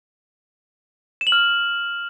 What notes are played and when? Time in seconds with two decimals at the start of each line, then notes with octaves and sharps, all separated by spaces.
1.21 E7
1.27 F#7
1.32 F6